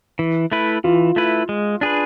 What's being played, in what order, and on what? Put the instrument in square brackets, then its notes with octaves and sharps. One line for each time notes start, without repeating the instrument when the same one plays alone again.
[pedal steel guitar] E3
A3 E4 B4
[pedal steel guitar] E3 [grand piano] F4
[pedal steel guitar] A3 E4 B4
G#3
D4 G#4 B4